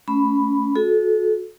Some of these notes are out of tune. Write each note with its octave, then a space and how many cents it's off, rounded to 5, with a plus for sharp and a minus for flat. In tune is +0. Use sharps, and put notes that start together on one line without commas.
A3 +0 C#4 +20 B5 +0
F#4 -30 A4 -30